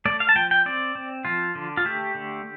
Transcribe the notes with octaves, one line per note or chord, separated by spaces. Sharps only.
A3 D5
F5
A5
F3 G5
G5
C4 D5
C4
F3 F4
D3
F4
A3 G4
D3